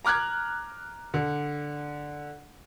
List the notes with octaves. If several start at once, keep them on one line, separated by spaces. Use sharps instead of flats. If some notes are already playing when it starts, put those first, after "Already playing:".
A#5 D6 F6 F#6 G#6
D3